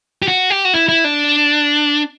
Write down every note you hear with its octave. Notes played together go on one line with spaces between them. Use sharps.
G4
F#4
G4
F#4
E4
E4
D4